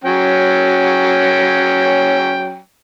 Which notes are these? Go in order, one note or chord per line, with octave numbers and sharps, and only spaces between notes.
F#3 C#4 G5